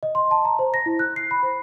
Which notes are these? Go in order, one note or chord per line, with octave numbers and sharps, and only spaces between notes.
D#5
C6
A5
A#5
C5
A#6
E4
F#6
C7
B5
C5